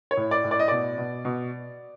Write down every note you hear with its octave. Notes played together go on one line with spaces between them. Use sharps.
C#5
A2
D5
A2
D5
D#5
B2 D5
B2
B2